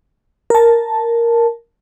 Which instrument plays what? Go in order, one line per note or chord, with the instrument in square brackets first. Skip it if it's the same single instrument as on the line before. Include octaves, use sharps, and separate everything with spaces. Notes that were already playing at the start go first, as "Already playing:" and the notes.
[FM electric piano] A#4 A5